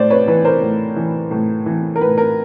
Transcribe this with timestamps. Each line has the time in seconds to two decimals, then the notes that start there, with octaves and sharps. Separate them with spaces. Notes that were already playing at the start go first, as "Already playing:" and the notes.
Already playing: A2 C5 D5
0.10 B4 C#5
0.28 E3 B4
0.45 A#4 C5
0.62 A2
0.96 E3
1.31 A2
1.66 E3
1.96 A#4
2.01 A2 B4
2.18 A#4